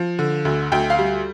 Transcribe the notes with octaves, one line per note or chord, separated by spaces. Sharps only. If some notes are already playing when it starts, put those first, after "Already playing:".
Already playing: F3
D3
D2
D2 G5
F5
G3